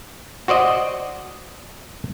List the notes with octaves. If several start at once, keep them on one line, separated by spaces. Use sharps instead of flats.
F#4 C5 D5 D#5